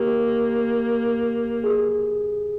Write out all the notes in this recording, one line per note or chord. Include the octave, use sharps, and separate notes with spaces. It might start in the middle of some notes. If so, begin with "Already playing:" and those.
Already playing: A#3 G4
G#4